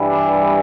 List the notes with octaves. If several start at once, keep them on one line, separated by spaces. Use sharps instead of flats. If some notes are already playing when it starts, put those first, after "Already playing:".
Already playing: G2 E3 G3
D4